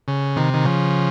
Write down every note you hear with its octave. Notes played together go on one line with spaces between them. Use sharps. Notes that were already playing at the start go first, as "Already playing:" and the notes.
C#3
C3 D#3
D#3
C#3 F3